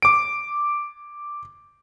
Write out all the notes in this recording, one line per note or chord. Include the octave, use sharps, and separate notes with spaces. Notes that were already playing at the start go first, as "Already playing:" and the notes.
D6 D7